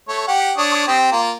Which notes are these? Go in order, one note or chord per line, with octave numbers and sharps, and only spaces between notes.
A3 C#5
G4 F#5
D4 C#5 D#6
C4 G4
A#3 F4